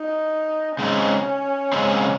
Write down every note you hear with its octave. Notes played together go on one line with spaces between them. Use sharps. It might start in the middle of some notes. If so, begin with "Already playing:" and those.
Already playing: D#4
C#3 G#3 C4 C#4 D#4
C#3 G#3 C4 D#4